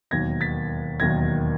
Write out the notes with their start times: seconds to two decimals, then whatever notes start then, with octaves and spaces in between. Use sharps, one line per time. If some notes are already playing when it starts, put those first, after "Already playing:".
0.11 E1 D#2 D#3 F#3 G#6 A#6
0.41 A6 B6
1.00 E1 D#2 D#3 F#3 G#6 A#6